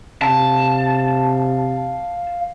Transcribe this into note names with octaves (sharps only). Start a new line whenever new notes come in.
C3 F5 A5